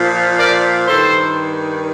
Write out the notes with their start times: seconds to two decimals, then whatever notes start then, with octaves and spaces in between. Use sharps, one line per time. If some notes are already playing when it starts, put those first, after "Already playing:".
Already playing: A#2 F3
0.39 A#4 D5
0.87 G2 D#3 A4 C5